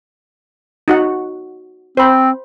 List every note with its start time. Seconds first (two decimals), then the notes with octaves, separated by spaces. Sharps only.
0.88 D#4 F#4 F#5
1.97 C4 C5 B5